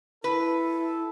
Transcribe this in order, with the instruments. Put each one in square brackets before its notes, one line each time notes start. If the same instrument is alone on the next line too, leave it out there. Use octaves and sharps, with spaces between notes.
[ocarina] E4 [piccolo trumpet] A4 [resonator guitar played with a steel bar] B4